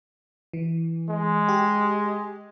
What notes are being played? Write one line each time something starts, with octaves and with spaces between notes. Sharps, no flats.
E3
G#3
G4